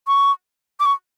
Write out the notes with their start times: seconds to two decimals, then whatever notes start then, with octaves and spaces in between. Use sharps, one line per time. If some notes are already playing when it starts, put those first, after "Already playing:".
0.08 C#6
0.80 D6
0.86 C#6